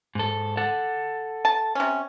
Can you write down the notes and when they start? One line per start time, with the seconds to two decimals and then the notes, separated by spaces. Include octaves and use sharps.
0.15 G#2 A4
0.57 A4 F#5
1.45 A5
1.75 C3 C#4